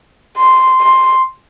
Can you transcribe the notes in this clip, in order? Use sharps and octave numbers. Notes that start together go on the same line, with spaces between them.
C6
C6